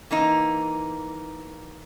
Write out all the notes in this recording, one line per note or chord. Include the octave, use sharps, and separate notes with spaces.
E3 A#3 D#4